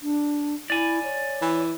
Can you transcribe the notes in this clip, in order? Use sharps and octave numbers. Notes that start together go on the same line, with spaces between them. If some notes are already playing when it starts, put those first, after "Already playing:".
D4
E4 D5 G#5
C#5
E3